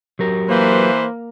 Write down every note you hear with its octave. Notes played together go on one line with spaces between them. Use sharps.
F#3 G4 A#4
E3 A#3 B4 C5